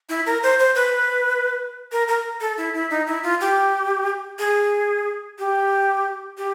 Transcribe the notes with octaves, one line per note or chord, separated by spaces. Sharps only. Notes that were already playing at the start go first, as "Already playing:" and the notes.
E4
A#4
C5
C5
B4
A#4
A#4
A4
E4
E4
D#4
E4
F4
G4
G#4
G4
G4